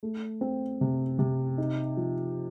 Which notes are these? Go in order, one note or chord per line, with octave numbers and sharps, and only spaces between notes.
A3
C4
C3
C3
D#4
F3